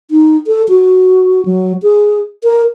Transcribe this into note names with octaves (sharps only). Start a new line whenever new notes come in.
D#4
A4
F#4
F#3
G#4
A#4